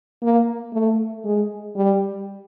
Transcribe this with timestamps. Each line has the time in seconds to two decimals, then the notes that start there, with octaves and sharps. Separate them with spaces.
0.22 A#3
0.73 A3
1.25 G#3
1.76 G3